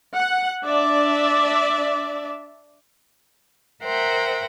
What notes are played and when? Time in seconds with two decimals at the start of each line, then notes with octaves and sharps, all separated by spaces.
0.14 F#5
0.65 D4 D5 E5
3.84 A#4 C5 E5 F#5 G5 A#5